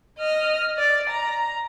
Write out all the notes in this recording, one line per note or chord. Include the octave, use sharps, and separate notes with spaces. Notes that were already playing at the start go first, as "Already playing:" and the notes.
D#5 F6
D5
A#5